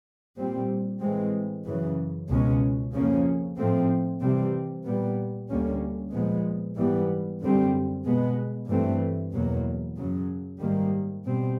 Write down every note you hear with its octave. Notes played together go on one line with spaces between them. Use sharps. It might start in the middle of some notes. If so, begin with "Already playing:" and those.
A#2 G3 C4
A2 E3 G#3 C4
F#2 C#3 E3
C#2 B2 G#3 C#4
F2 C#3 F3 A#3 C#4
A2 F3 A3 C4
C3 E3 G3 C4
A#2 G3 B3
D2 D3 G3 A#3 C#4
A#2 F3 G#3 B3
G#2 E3 G3 B3
F#2 D3 G3 C4
B2 G#3 B3
G2 E3 A3 C4
E2 B2 F#3 A#3
F#2 C#3 F#3
G#2 D#3 G3 A#3
B2 G3 C4